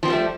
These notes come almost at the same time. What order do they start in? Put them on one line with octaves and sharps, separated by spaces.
F3 C4 G3 B3 A3